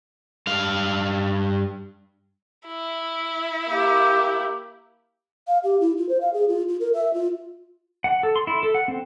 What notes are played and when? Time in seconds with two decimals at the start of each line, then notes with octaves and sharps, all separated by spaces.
0.47 G2 F5
2.67 E4
3.69 A#3 G4
5.48 F5
5.64 G4
5.81 E4
5.98 F4
6.09 C5
6.21 F5
6.34 G#4
6.49 F4
6.69 F4
6.80 A#4
6.94 E5
7.14 F4
8.04 F#5
8.23 A4
8.36 C6
8.47 E4
8.63 A4
8.74 F#5
8.88 C4